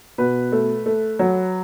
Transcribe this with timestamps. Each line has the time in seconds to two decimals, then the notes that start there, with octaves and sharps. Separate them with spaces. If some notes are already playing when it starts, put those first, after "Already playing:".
0.18 B2 B4
0.52 A3
0.86 A3
1.19 F#3